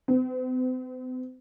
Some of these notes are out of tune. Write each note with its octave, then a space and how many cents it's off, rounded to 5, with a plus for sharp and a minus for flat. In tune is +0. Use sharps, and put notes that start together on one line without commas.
C4 -45